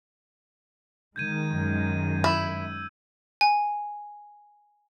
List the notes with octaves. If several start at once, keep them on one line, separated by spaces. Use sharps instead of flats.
D#3 G#3 G6 G#6 D#7
F#2
E4 E6
G#5